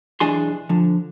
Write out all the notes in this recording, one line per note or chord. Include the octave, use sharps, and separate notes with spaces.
B1 E2 E3 D4 G#4 C6
D3 F3